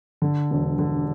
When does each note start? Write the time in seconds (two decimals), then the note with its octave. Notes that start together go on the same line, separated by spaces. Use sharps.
0.22 D3
0.51 E1
0.79 D3